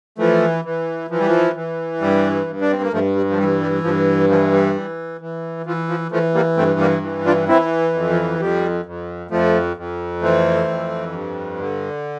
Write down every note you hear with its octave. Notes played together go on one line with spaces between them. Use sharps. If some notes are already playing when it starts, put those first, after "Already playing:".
E3 F3 A3
E3
E3 F3
G3
F3
E3
G2 G3
G2
D4
C4
A#3
G2 F3 A3
G3
F3
E3 G3
G3
G2 F3
E3 F3
G3
E3
E3
E3 F3
F3
E3 F3 A3
G3 A#3
G2 A3 C4
G3 A#3
E3
D4 F4
E3 C4 E4
F2
F3
F2 G3
F2
F2 F3 A3
F2
E3 A3 C4
F2
G2
D3